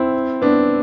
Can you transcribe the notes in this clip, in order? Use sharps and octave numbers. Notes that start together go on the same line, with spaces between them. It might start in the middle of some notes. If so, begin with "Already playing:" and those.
Already playing: C4 E4
B3 D4